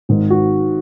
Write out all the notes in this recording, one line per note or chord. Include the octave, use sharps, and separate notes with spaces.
G#1 G#2 D#3
F#4